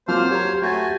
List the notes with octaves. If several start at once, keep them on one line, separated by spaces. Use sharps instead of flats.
F#3 A#3 C4 F4 C5 F6
G4 C#5 A#5
A3 F#4 G4 G#5 G6 A6